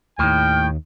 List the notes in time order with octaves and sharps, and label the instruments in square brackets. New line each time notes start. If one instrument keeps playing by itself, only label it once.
[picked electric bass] D#2 D#3 [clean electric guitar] A2 [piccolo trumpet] G5 [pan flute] F6